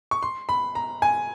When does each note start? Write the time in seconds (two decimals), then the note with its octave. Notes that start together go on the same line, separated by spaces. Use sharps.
0.11 C#6
0.23 C6
0.49 B5
0.75 A#5
1.02 G#5